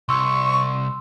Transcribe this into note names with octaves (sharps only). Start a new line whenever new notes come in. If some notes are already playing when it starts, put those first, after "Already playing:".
C2 C6 C#6 E6